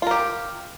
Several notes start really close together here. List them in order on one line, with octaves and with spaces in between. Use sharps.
F4 A#4 G4